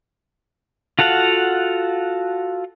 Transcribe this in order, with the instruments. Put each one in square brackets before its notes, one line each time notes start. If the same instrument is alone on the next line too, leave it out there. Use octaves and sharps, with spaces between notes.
[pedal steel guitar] F4 F#4 A4 F5 F#5